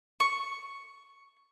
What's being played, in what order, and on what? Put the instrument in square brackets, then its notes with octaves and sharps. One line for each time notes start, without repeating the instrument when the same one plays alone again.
[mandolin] C#6